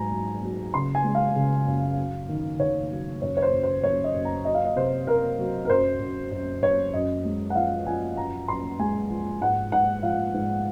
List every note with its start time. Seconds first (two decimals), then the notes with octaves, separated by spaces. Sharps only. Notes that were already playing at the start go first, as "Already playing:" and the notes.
Already playing: G#2 F#3 G#5 A#5
0.12 F#3
0.43 F#3
0.74 C#3 C6
0.95 G#5
1.04 G#3
1.15 F5
1.36 C#3
1.67 F#2
1.97 F#3
2.29 D#3
2.59 D#3 C#5
2.90 F#3
3.22 F#2 C#5
3.37 C#5
3.42 C5
3.53 F#2
3.63 C5
3.83 F#2 C#5
4.04 D#5
4.15 F#2
4.25 A#5
4.45 F#3 D#5
4.55 F5
4.64 D#5
4.76 C3 C5
5.07 C3 A#4
5.39 F#3
5.65 A#4
5.69 F#2 C5
6.00 F#2
6.31 F#2
6.62 F#2 C#5
6.93 F#2 D#5
7.25 G#3
7.50 F#5
7.55 F3 F5
7.87 F3 G#5
8.17 F#2 A#5
8.48 F#2 C6
8.79 G#3 G#5
9.10 F3
9.41 G#2 F#5
9.72 G#2 F#5
10.03 F3 F5
10.34 G#2